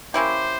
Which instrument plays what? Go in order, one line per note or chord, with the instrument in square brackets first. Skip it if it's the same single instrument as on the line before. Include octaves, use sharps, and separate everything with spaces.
[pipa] A#3 C#4 E4 G4 [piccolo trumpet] C5